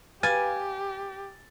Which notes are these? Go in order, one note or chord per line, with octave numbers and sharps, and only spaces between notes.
G4 B4 F5 G#5 A6